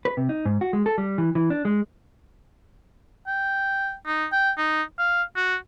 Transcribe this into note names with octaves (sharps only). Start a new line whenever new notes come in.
B4
C3
D#4
G#2
F#4
G#3
A4
G3
E3
E3
D4
G#3
G5
D#4
G5
D#4
F5
F#4